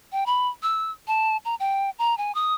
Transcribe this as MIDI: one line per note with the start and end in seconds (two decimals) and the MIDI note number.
0.12 0.24 79
0.26 0.48 83
0.63 0.91 88
1.08 1.37 81
1.45 1.55 82
1.60 1.90 79
1.99 2.17 82
2.18 2.34 80
2.35 2.55 87